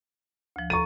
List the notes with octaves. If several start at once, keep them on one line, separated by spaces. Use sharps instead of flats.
D2 F3
A4 A#5 C#6 D#7